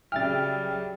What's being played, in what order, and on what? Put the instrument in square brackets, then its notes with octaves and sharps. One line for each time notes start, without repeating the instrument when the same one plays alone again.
[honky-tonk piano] C#3 E5 G5 [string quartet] F#3 G3 [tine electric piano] F6 A6